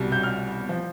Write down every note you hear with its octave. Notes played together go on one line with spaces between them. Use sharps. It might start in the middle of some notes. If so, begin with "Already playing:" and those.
Already playing: C2 B2 G3
G6
F6
F3